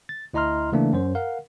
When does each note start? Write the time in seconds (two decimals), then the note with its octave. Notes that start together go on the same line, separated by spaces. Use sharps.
0.09 A6
0.34 D2 E4 D#5 A#5 C6 F6
0.72 C#3 E3 A3 A#3 D4
0.93 F#2 C5
1.15 A#4 F5 F#5